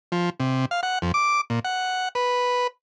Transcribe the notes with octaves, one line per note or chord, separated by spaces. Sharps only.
F3
C3
F5
F#5
F2
D6
A#2
F#5
B4